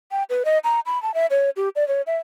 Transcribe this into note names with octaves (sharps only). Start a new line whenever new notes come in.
G5
B4
D#5
A#5
B5
A5
E5
C#5
G4
D5
C#5
E5